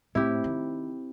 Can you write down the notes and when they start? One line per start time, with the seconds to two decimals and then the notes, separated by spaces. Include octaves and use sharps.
0.15 A2 C4 E4 G4
0.44 D#3